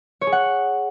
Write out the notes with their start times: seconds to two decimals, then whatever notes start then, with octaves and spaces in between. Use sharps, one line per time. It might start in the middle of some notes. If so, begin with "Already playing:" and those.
0.21 C#5
0.27 G#4
0.32 F#5